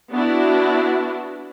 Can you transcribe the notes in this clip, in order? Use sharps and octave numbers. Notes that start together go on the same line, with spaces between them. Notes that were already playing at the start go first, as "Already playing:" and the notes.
B3 D4 E4 F#4